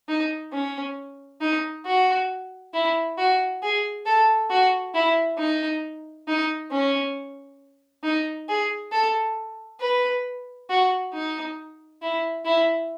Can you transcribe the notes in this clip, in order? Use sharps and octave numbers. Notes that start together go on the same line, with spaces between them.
D#4
C#4
D#4
F#4
E4
F#4
G#4
A4
F#4
E4
D#4
D#4
C#4
D#4
G#4
A4
B4
F#4
D#4
E4
E4